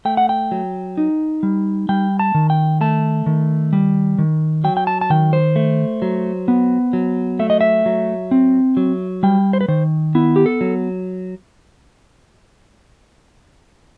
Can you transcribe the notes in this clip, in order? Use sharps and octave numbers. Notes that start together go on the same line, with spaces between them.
A3 G5
F#5
G5
F#3
D#4
G3
G3 G5
A5
D#3
G5
A3 A5
D#3
G3
D#3
F#3 G5
G5
A5
A5
D#3 G5
C5
A3
F#3
B3
F#3
A3 E5
D#5
E5
F#3
C4
F#3
G3 G5
C5
B4
D#3 C5
B3 E4
G4
A4
F#3